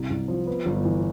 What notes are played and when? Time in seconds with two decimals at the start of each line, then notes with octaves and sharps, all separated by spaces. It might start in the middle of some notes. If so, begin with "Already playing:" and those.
Already playing: C2
0.10 C2
0.28 F3
0.47 B3
0.66 G1
0.85 E3